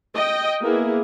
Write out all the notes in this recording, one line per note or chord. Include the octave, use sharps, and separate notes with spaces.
D#5 G5
A#3 B3 E4 G#4